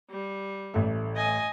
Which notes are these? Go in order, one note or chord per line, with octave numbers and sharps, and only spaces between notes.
G3
A1 A3
D#5 G#5